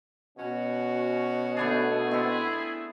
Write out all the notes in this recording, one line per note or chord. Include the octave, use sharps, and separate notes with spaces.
B2 C#4 F#4
A3 B3 D4 G#4
B3 C4 E4